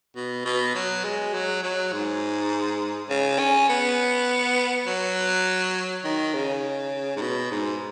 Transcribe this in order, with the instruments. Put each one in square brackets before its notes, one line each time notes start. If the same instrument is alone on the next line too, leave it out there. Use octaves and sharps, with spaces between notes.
[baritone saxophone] B2
B2
F#3
G#3
F#3
F#3
G#2
C#3
C#4
B3
F#3
D#3
C#3
G#2
B2
G#2